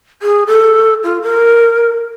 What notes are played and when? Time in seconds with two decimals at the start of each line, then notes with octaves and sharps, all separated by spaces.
0.22 G#4
0.47 A4
1.03 F4
1.22 A#4